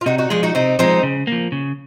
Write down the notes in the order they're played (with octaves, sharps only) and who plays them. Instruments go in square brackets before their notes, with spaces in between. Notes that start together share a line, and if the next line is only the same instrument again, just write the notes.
[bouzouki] F4
[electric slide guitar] C3 [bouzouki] D#4 F#4
[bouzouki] D#4 F#4
[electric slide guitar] F3 G#3 [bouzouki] F4 G#4
[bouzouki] D#4 F#4
[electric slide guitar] C3 [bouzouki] C4 D#4
[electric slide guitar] F3 G#3 [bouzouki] C4 D#4
[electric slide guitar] C#3
F3 A#3
C#3